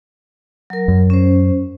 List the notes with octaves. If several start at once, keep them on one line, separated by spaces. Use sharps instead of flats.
F#3 A#4
F#2
C#4 C5